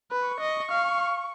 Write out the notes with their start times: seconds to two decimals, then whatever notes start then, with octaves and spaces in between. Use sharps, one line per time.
0.11 B4
0.27 C#6
0.40 D#5
0.71 F5